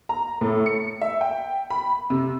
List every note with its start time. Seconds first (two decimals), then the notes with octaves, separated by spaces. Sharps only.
0.09 A#5
0.41 A2
0.66 C#7
1.01 E5
1.21 G5
1.70 B5
2.10 C3